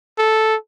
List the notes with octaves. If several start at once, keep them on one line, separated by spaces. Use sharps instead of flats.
A4